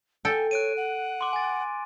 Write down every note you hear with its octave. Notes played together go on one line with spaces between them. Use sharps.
A4 G5 G#5
C#5 F#6 D7 D#7
F#5
C6 D6
G#5 A6